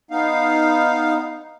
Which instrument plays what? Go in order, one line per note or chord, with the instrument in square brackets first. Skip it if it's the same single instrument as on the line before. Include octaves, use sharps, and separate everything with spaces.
[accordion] B3 D#4 F5